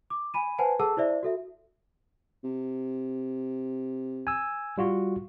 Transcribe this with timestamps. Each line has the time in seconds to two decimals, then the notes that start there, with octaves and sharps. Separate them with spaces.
0.10 D6
0.34 G#5 B5 D#7
0.58 B4 C5 F#5 G#5 A5
0.79 G#4 A4 F#5 A5 E6
0.97 E4 C5 D5 E5
1.23 F#4 A4 E5
2.44 C3
4.27 G#5 E6
4.78 G3 F4 F#4